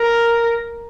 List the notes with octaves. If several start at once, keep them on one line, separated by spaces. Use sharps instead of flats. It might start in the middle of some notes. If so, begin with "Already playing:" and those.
Already playing: A#4